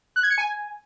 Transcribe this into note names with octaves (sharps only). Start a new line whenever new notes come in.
F#6
G#6
C#7
G#5